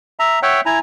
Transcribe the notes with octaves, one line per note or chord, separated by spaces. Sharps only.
E5 A#5
C#5 E5 F#5 G5
E4 G#5 A#5